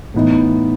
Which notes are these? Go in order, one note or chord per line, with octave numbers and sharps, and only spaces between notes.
A2 E3 B3 D#4